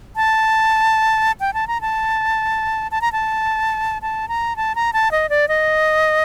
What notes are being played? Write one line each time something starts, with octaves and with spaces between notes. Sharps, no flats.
A5
G5
A5
A#5
A5
A5
A#5
A5
A5
A#5
A5
A#5
A5
D#5
D5
D#5